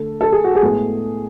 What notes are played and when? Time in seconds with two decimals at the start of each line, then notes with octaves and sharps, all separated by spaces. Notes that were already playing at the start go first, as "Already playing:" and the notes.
Already playing: D3 A3 A4
0.21 A4
0.32 G#4
0.44 F#4
0.55 G#4
0.62 A2 G#3 B3